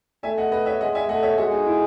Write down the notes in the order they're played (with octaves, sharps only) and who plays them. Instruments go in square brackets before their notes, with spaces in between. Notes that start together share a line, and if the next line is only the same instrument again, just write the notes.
[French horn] A3 [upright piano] E5 G#5
[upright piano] D#5 F#5
B4 D#5
C#5 E5
[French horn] G#3 [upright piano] D#5 F#5
[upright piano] E5 G#5
[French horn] A3 [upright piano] D#5 F#5
[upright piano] C#5 E5
[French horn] G#3 [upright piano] F#4 A4
[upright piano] D#4 F#4
E4